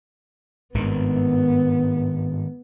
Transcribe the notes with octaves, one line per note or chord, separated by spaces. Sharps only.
G#1 G2 D#3 B3